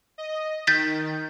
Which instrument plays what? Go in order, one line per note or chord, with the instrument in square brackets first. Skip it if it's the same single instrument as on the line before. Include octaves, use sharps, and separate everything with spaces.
[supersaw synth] D#5
[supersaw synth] D#3 [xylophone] G6 A6 B6